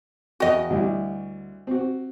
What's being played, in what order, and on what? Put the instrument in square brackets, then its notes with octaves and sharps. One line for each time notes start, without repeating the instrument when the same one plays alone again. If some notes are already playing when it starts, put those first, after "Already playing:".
[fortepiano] E2 G5 [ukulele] F#4 D#5
[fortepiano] D2 G3 E4
C4 F#4